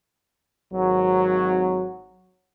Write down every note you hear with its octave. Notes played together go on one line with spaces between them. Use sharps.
G#1 F#3